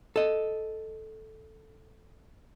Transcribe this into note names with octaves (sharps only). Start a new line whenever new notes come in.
A4 D#5